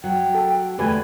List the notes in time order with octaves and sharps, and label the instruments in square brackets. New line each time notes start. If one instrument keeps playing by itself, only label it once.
[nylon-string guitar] F#3 [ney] G5
[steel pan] A4
[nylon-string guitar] E2 D3 G#3 [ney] A3 [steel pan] G4 B4 G#5